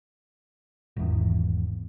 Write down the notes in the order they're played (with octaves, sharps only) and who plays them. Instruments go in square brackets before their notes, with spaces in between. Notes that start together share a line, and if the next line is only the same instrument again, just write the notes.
[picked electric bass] G#1 E2